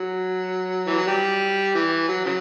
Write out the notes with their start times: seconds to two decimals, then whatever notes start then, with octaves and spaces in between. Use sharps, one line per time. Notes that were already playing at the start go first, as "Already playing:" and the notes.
Already playing: F#3
0.87 E3
0.97 F#3
1.07 G3
1.75 E3
2.08 F#3
2.25 C#3 F#3